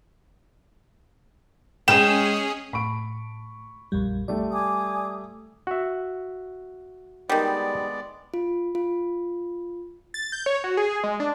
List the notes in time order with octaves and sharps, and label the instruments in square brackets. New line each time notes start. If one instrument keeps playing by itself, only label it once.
[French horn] G#3 [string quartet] C#4 G#4 [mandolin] G5 [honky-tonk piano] E7
[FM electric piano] A2 [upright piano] B5 C#6 D7
[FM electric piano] A#1 F2 G3
[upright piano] G3 A3 [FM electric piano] D5
[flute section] G#5 D6 D#6
[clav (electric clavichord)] F#4 E5
[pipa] D#3 G3 [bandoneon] G#3 B3 D5
[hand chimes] F4
F4
[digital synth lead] A6
G6
C#5
F#4
G#4
G#4
G#3
D4